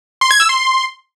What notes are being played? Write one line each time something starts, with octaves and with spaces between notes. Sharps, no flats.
C6
G#6
E6
C6